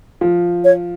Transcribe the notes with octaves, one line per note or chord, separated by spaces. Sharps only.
F3
C#5